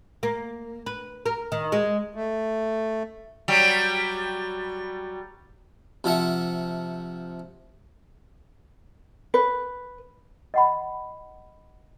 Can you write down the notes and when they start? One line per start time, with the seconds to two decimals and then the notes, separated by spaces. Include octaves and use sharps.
0.23 A#3
0.86 B4
1.26 A#4
1.52 D#3
1.72 G#3
2.15 A3
3.48 F#3 G3
6.04 C3 F3 E5 F#5
9.34 B4
10.54 D#5 F#5 B5